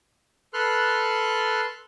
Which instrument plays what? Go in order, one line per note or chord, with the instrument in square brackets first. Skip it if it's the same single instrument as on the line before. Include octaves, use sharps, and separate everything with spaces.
[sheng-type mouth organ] A4 B4 C6 F6 F#6